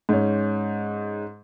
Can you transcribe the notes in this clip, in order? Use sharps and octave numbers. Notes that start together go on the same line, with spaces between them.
G#2 C#4